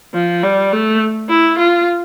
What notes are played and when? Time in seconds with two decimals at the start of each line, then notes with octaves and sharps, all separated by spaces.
0.14 F3
0.43 G3
0.72 A3
1.29 E4
1.58 F4